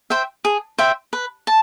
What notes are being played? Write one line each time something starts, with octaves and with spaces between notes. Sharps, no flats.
C5 E5 G5
G#4
C5 E5 G5
B4
A5